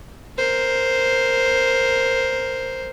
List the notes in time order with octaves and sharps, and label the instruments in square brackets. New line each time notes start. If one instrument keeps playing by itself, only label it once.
[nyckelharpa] A#4 C5